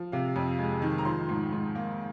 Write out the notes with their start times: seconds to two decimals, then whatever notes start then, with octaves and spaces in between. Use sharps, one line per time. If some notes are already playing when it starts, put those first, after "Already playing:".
Already playing: F3
0.12 C3 F5
0.36 F2
0.59 G#3
0.82 D#3
0.98 A#5
1.05 F3 C6
1.29 G#2
1.52 G#2
1.75 A#3